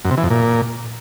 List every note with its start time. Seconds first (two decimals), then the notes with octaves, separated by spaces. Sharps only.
0.05 F#2
0.11 C3
0.17 E3
0.24 F2
0.30 A#2